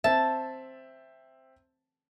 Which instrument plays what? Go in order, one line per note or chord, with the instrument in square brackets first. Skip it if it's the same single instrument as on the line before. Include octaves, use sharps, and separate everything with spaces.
[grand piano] C4 E5 [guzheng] A5